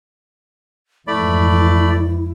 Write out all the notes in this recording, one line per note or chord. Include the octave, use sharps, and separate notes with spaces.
F2 G#2 E3 A3 E4 D5 B5